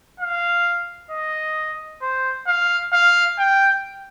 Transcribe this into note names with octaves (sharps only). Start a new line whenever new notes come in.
F5
D#5
C5
F5
F5
G5